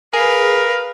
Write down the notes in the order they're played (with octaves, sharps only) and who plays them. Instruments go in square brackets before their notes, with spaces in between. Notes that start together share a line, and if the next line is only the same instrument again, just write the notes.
[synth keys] G#4 [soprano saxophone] A#4 [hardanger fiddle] B4 F5